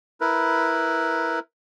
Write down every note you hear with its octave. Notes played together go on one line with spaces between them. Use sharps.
E4 A#4 B4